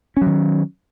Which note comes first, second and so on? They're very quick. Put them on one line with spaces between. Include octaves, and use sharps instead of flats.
C#4 F#3 D#3